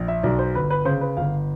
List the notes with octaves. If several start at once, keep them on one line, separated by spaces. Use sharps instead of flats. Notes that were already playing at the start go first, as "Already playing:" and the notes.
Already playing: A#1
E5
B1 D5
C5
G1 B4
B4
C#3 C5
B4
G1 F5